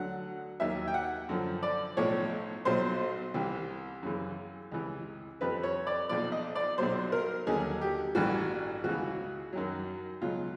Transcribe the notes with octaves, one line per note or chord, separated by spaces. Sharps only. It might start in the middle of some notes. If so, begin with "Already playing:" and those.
Already playing: D2 D3 F#3 F#5
D#2 D#3 F#3 E5
G5
F#5
F#2 D3 F3
D5
B1 A2 F3 C#5
B1 A#2 F#3 C5
C2 C3 E3
F#2 C#3 E3
C#2 C3 E3
F2 C3 F3 B4
C#5
D5
B1 A#2 F3 D5
D#5
D5
B1 A#2 F#3 C5
A#4
D#2 D3 F#3 G#4
G4
A1 G2 E3 F#4
C#2 C#3 E3 F#4
F#2 D#3 F#3
C#2 B2 F#3 F4